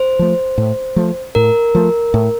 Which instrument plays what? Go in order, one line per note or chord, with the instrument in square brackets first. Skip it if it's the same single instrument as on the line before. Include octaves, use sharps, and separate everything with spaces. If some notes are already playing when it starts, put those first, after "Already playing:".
Already playing: [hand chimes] C5
[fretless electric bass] F3 A3
A2
F3 A3
[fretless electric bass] A2 [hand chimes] A#4
[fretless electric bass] F3 A3
A2